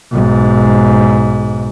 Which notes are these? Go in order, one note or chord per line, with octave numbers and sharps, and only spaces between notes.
B1 G#2